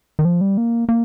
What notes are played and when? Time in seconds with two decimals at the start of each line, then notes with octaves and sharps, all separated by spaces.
0.19 D#3
0.25 F3
0.41 G3
0.57 A#3
0.89 A#3